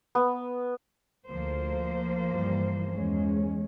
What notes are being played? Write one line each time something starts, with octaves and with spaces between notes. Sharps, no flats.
B3
D2 F3 A#3 C5
G2 E3 G3
E2 G#3 C#4